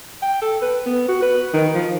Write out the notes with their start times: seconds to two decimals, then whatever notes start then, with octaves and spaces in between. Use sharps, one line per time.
0.22 G5
0.42 A4
0.62 B4
0.86 B3
1.08 F#4
1.22 B4
1.54 D#3
1.75 F3